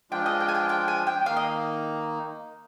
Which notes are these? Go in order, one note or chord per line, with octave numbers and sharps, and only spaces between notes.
F3 G#3 D4 F4 G5
D#5
G5
G#5
G5
G5
G#5
G5
D#3 A#3 D#4 F5
D#5